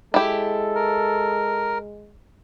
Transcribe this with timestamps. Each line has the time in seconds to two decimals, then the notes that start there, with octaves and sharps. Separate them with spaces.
0.14 G#3 E4 G4 A4
0.75 A#4